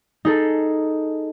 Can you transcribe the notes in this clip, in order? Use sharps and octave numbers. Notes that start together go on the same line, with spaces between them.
D#4 G#4 A4